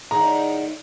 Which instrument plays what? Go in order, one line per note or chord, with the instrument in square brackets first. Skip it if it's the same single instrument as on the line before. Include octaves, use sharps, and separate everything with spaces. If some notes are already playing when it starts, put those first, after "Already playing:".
[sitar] A2 D#3 D#4 [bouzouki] G#4 D5 F#5 [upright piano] A#5